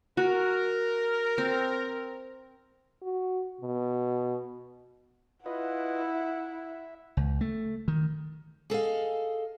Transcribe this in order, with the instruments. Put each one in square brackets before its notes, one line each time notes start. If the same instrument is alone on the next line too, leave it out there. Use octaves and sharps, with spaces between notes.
[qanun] F#4 [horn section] A#4
[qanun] C4
[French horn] F#4
B2
[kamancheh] E4 F#5 [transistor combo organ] F4 B4 D#5
[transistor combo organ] E5
[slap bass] C#2
A3
D#3
[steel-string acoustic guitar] G#4 A4 D#5 F5